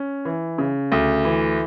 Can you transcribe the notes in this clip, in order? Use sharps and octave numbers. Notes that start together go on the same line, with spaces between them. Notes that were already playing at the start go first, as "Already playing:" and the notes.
Already playing: C#4
E3
C#3
D2
E3